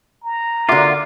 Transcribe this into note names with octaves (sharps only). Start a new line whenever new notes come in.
A#5
D3 A#3 F4 F#4 E5 D6